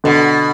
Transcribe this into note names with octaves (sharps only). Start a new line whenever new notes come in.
B2 D3